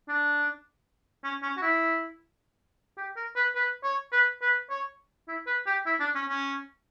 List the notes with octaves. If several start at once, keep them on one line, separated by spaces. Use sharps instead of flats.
D4
C#4
C#4
F#4
E4
G4
A#4
B4
B4
C#5
B4
B4
C#5
E4
B4
G4
E4
D4
C#4
C#4